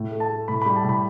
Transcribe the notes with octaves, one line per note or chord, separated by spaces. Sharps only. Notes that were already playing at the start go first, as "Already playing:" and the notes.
Already playing: A2
A3
A5
A3
A2 B5
B5
G3
A5
A2 B5